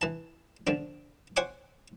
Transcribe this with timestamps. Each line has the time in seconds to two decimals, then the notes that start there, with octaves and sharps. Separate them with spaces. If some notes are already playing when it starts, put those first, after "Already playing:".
0.01 E3 A5
0.67 D3 F3 D4
1.36 C5 C#5 F#5 G#5 D6